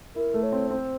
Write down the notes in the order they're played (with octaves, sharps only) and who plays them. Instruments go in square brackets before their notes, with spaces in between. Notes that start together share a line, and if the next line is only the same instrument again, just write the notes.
[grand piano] E4 [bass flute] A#4
[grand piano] A3
[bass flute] C#5
[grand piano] C4
[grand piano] C4 [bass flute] C5